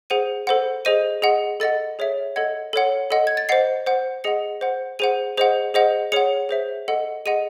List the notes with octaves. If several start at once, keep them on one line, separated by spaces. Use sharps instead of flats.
G#4 C5 F#5 D#7
A4 C5 F#5
G#4 C5 D#5 D#7
G#4 D#5 F#5
A4 D#5 F#5 A6
G#4 C#5 E5
A4 D#5 F#5 G#6
A4 C#5 F#5
A4 D#5 F#5
G#6
A6
C5 D#5 F#5 C7
C5 F#5
G#4 D#5 F#5 C#7
C5 F#5
G#4 C5 F#5 D#7
G#4 C5 D#5 F#5
G#4 C5 D#5 F#5
G#4 C#5 F#5 C#7
G#4 C5 E5
A4 D#5 F#5
G#4 D#5 F#5 D#7